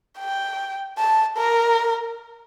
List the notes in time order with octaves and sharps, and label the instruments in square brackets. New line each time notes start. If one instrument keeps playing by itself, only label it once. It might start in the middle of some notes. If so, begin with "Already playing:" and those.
[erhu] G5
A5
A#4